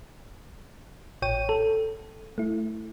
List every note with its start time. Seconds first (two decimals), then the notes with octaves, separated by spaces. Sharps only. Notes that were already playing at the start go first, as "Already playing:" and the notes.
1.22 A1 C#5 G5 D#7
1.49 A4
2.38 A3 E4